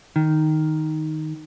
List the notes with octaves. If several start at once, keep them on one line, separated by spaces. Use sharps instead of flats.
D#3